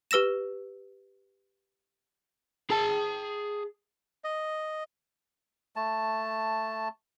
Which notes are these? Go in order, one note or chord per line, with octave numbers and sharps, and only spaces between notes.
G4 B4 E6 A#6 E7
G#4 A5
D#5
A3 A5